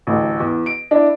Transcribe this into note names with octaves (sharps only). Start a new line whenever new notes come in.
A1 D2
E2
D7
D4 E4